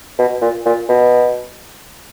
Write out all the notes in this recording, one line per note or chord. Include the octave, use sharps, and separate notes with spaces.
B2
A#2
A#2
B2